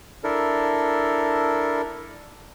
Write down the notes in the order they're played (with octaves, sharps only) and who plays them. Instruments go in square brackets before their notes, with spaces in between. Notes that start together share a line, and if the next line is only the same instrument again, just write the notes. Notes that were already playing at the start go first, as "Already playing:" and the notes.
[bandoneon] D4 E4 A4 A#4